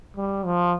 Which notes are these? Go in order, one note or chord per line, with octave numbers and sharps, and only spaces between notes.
G3
F3